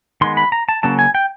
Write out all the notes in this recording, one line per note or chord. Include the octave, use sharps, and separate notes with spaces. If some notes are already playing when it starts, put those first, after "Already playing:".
D#3 G#3 B3 C6
B5
A#5
A5
C#3 F#3 A#3 C#4 A5
G#5
G5